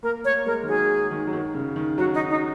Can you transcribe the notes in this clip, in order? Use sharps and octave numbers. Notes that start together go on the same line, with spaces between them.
A#3 A#4
A#3 C#5
G#3 A#4
D#3
F#3 G#4
D#3
F#3
D#3
C#3
D#3
F#3 F#4
D#4
D#4